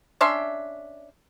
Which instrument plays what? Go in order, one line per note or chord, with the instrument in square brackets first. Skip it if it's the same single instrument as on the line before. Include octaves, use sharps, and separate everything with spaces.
[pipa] C#4 D4 E5 C6